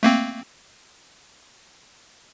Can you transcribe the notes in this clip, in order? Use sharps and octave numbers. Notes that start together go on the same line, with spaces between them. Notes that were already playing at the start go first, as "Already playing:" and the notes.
A3 A#3 C4